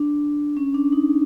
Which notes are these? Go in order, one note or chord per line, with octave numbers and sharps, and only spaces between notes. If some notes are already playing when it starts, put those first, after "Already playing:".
Already playing: D4
C#4
D4
D#4